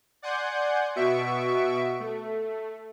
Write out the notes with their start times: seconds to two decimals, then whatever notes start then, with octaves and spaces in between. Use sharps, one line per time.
0.22 D5 F#5 G#5 C6 G6
0.96 B2 B3 F#4 E5 C#6 D7
2.00 A3